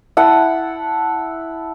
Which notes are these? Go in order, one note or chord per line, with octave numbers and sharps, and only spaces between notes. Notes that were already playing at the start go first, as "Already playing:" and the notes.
E4 F#5 A5